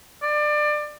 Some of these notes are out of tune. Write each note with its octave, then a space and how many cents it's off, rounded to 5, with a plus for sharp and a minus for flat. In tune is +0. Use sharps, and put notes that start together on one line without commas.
D5 +25